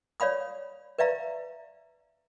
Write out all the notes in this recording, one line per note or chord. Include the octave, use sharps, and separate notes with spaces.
C#5 D5 F5 B5 D#6
B4 D5 E5 F5 A#5